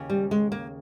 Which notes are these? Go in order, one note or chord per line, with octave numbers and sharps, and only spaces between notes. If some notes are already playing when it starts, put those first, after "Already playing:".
Already playing: D#2 C#3
G3
G#3
A#3